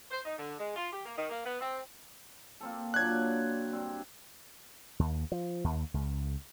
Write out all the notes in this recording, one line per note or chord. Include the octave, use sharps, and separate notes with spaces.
C5
D#4
D3
G#3
F4
G4
A#3
D#3
A#3
B3
C4
A#3 C4 A4
A#2 F#3 D4 F#6 G#6
G2 C4
D#2
F3
D#2
C#2